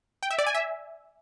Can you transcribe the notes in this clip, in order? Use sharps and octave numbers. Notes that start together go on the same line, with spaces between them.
G5
E5
D5
G#5
E5